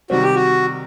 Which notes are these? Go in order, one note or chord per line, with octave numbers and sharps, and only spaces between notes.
C3 D#3 G3 C4 F#4
G4
F#4